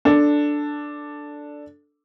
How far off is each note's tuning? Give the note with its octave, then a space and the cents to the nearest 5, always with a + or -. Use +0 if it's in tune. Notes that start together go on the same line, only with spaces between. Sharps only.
D4 +0 A4 +0